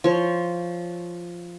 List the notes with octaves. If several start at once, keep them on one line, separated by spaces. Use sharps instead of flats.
F3 C#5